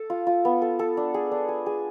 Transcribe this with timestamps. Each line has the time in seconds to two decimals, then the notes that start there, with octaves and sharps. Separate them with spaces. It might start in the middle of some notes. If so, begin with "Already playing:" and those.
Already playing: A4
0.10 F4
0.27 F4
0.45 B3
0.62 A4
0.79 A4
0.97 D4
1.14 G#4
1.31 D4
1.49 G#4
1.66 G#4